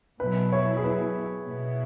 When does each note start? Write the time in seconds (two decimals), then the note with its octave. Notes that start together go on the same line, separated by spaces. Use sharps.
0.20 B2 F#3 E4 B4
0.52 C#5
0.77 G#4
0.84 B4
1.48 B2 B3 E4